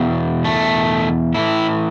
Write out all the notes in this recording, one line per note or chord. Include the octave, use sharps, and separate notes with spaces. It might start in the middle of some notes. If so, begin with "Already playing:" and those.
Already playing: E2 B2
A3
A2 E3 E4